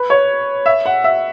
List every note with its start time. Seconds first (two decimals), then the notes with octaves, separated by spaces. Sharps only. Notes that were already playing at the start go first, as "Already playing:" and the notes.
Already playing: B4
0.10 C#5
0.66 E5
0.86 F#5
1.04 E5